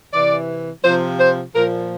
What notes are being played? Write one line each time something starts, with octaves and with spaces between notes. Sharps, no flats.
C3 E3 D5
C3 F3 C5
C5
A#2 F3 A#4